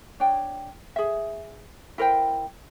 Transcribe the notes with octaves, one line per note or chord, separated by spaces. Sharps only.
D4 C#5 G5
G#4 E5
E4 A#4 C5 G5